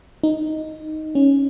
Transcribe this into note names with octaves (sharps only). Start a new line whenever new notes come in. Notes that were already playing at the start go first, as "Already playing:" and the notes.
D#4
C#4